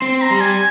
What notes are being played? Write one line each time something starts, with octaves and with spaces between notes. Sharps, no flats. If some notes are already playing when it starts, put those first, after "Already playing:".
C4 C6
A#5
G3
G#5